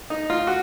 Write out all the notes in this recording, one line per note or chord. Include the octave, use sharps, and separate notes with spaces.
D#4
F4
F#4